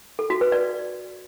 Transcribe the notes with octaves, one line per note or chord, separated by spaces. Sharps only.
A4
F#4
B4
D5